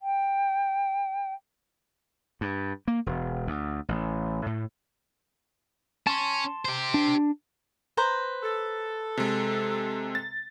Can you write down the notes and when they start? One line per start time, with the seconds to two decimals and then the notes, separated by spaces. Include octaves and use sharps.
0.01 G5
2.41 G2
2.88 A#3
3.06 E1
3.47 D2
3.89 A1
4.46 A2
6.07 C#4 A5 C6
6.65 G4 C5
6.94 D4
7.97 B4 C5 A#5
8.43 A4
9.17 C3 G#3
10.15 A6